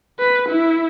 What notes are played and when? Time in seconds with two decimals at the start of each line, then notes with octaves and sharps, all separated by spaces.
0.19 B4
0.48 E4